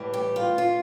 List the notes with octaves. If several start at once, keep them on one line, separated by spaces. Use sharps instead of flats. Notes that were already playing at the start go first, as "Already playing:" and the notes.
Already playing: A2 E3 G3
G4
F4
F4